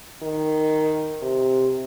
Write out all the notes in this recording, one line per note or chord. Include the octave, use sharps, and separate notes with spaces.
D#3
C3